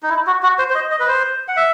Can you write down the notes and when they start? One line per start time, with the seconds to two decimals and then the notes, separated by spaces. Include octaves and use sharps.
0.03 D#4
0.09 E4
0.27 F#4
0.43 F#4
0.59 C5
0.70 C5
0.75 D#5
0.91 D#5
1.00 B4
1.08 C5
1.48 F#5
1.57 E5